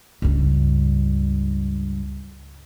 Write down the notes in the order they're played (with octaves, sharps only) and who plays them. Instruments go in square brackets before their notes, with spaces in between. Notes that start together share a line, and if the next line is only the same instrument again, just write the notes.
[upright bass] C#2 G2